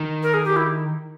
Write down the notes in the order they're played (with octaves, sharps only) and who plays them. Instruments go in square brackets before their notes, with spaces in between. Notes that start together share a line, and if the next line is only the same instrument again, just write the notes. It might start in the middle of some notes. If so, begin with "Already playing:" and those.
Already playing: [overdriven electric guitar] D#3
[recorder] A#4
G#4
G4
E4